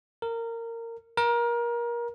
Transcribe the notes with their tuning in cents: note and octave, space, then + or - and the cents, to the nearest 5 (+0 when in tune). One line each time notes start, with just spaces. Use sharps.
A#4 -20
A#4 +25